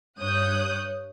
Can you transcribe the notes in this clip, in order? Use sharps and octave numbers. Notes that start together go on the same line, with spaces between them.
G2 C#5 D#6 F#6 G6